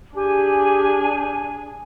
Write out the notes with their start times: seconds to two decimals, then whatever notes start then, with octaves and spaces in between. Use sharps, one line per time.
0.17 D4 G4 G#4 G#5